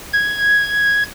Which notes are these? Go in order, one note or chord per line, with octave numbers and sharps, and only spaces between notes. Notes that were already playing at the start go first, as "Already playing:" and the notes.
G#6